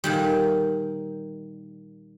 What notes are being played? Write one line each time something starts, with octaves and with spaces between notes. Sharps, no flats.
A#2 D#3 G3